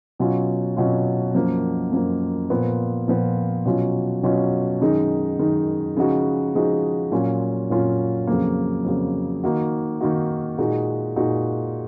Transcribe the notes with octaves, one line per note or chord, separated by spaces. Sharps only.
B2 F#3 C#4 F4
B2 F#3 C#4 F4
F#2 F3 A#3
F#2 F3 A#3
A#2 F3 B3
A#2 F3 B3
B2 F#3 C#4 F4
B2 F#3 C#4 F4
F#2 D#3 G#3 D#4
F#2 D#3 G#3 D#4
C#3 F3 G#3 D#4 F#4
C#3 F3 G#3 D#4 F#4
A#2 F#3 C#4 F4
A#2 F#3 C#4 F4
F2 C#3 F#3 A#3
F2 C#3 F#3 A#3
D#3 A#3 D#4 F#4
D#3 A#3 D#4 F#4
A#2 G#3 D#4 F#4
A#2 G#3 D#4 F#4